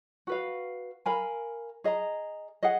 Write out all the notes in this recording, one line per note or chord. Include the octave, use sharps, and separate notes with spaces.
F#4 B4 F5
A#4 F5 G#5 B5
G#4 D#5 A#5
G#4 D#5 F#5